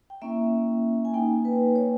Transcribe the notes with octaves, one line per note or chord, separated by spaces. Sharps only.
G5
A#3 C#4 E4 E5
G#5
A#3 D#4 G5
B4
C#5